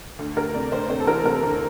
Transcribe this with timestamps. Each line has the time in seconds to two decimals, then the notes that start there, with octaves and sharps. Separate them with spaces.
0.19 D2
0.37 D2 A#4
0.54 C3 D5
0.72 D2 C5
0.89 C3 C5
1.00 A4
1.07 E3 A#4
1.25 C3 A#4
1.43 D2